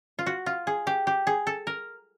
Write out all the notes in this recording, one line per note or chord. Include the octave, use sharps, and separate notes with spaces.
F4
F#4
F4
G#4
G4
G4
G#4
A4
A#4